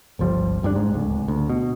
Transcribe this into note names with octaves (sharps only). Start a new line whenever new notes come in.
G1 C#2 F3 G3
G#1 G2 D#3 D4
G#2
D1 C#2
D2
B2